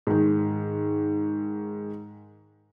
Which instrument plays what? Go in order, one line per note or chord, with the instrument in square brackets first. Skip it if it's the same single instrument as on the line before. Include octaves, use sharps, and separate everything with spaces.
[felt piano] G#2 D#3